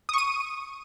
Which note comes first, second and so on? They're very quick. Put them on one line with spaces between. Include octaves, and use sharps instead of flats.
D#6 C#6 D#7